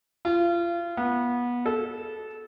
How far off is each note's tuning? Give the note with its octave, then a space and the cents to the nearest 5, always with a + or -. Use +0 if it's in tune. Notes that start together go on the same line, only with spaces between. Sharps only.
F4 -30
B3 -25
A4 -20